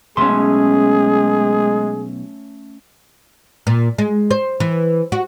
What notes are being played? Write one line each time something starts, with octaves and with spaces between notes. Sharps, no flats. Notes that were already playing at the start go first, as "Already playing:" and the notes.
B1 B2 G#3 A3 C#4 G#4 C6
A#2
G#3
C5
E3
F#4